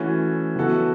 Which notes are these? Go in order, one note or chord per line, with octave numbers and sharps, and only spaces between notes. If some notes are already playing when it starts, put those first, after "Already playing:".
Already playing: E3 A3 C#4 F#4
E3 B3 F#4 A4